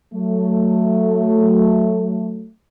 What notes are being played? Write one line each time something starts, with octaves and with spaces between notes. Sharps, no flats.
F#3 A3